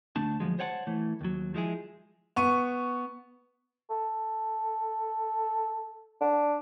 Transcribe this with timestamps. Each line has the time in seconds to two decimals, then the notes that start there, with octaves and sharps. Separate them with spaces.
0.16 D2 A3 D4 A5
0.40 D2 F3 F#3 G#3
0.59 C5 C#5 F#5 G5 A5
0.87 E3 A3
1.21 D#2 F#3
1.54 F3 G#3 E4 G#4
2.36 B3 C#6 D#7
3.90 A4
6.21 D4